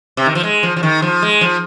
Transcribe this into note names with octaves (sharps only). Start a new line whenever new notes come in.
C3
D#3
F3
G#3
F3
F3
D#3
F3
G#3
F3